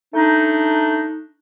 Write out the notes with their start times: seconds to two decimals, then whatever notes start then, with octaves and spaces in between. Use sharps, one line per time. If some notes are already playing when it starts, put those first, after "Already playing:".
0.14 A3 D4 D#4